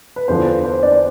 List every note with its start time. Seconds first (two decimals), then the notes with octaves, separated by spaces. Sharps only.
0.16 B4
0.28 E2 D3 F3 C5
0.47 B4
0.65 C5
0.83 D4 D5